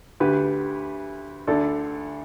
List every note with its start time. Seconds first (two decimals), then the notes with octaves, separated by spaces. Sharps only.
0.20 D2 D3 G4 B4
1.47 D2 D3 A4 D5